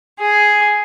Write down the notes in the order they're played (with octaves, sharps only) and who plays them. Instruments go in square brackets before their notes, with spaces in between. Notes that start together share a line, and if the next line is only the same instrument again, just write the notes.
[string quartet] G#4